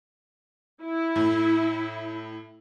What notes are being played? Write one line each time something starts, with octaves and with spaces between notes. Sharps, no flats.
E4
A2